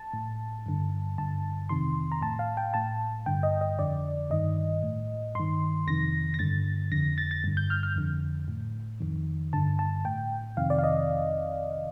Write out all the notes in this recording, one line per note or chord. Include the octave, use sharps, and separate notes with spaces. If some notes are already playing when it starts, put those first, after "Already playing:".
Already playing: A5
A2
G2 D3
G2 D3 A5
F2 C3 D#3 C6
A#5
A2 A5
F5
G5
A2 A5
G2 D3 G5
D#5
D#5
F2 D3 D5
G2 D#3 D#5
A2
G2 D#3 C6
F2 C3 D#3 A#6
A#6
G2 D3 A6
F2 D3 A#6
A6
A6
G2 D3
G6
F6
F6
F2 D3
A2
F2 D#3
G2 D3 A5
A5
A2 G5
F2 C3 D#3 F5
D5
F5
D#5